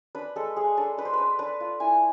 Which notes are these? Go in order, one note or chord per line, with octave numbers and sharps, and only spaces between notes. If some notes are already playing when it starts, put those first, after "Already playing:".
D4 B4
G#3 A4
G#3 G#4
D4 A4
D4 B4
C5
B4
D4
D4 B4
F4
E4 G#5